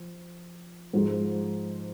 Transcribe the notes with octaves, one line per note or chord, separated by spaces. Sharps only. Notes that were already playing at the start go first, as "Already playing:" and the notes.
Already playing: F3
G#2 F3 G#3